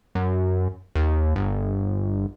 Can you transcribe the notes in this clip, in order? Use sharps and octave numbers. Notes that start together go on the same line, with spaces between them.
F#2
D#2
G1